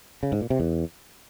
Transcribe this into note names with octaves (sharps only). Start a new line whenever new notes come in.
C#3
G#2
A#2
C3
E2